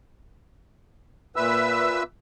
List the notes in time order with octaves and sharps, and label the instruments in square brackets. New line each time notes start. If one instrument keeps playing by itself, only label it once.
[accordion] A#2 B4 E5 E6